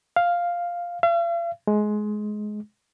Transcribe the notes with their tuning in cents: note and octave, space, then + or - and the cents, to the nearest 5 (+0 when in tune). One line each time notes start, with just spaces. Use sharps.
F5 +0
F5 -45
G#3 +20